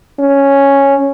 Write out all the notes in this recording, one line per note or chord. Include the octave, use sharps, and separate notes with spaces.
C#4